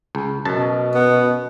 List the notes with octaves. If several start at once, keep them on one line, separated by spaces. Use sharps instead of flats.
C#2
F#2 B2 A5
B3